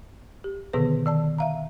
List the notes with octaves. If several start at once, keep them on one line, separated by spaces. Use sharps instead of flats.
G4
B2 D3 D#3 B3 G#4 B4
D#3 D5 A5
E5 F5 A#5